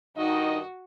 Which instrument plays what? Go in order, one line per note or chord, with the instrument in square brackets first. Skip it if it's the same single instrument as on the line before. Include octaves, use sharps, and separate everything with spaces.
[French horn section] G2 D#3 D#5 [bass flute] D#4 [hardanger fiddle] F#4